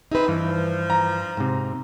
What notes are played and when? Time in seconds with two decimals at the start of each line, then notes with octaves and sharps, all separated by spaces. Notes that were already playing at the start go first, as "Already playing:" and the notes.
0.11 C4 D#4 G#4 B4 E5
0.28 G2 E3 F3
0.90 A#5
1.37 G#2 C3